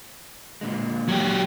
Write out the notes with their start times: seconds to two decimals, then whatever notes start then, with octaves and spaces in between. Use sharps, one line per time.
0.61 A#2 D3 G#3
1.08 F#3 G4